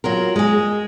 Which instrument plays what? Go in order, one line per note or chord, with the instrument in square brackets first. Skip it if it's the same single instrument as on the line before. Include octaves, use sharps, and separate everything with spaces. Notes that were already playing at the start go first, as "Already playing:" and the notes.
[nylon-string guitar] F#3 F4 A#4
G#3 G#4